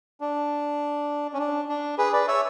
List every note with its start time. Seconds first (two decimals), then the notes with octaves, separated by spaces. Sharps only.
0.21 D4
1.33 C#4
1.39 D4
1.68 D4
1.98 G#4 B4
2.13 B4 D5
2.28 C#5 E5